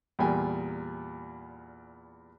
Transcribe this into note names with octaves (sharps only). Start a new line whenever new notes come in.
E2 A#2 G3 G5 G#5